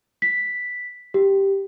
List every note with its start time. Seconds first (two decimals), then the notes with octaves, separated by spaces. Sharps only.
0.22 B6
1.14 G4